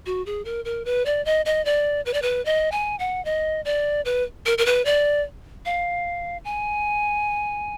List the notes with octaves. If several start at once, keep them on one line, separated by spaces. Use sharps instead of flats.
F#4
G#4
A#4
A#4
B4
D5
D#5
D#5
D5
B4
D5
B4
D#5
G#5
F#5
D#5
D5
B4
A#4
A#4
B4
D5
F5
G#5